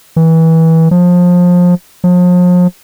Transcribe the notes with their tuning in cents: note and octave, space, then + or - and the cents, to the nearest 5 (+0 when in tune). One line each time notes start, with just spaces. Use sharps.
E3 -25
F3 +25
F3 +40